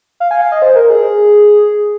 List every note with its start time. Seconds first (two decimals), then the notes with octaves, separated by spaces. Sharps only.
0.20 F5
0.31 G#5
0.41 F5
0.52 D#5
0.62 C5
0.76 A#4
0.90 G#4